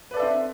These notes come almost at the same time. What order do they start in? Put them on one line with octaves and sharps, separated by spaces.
B4 D5 A4 E5 C4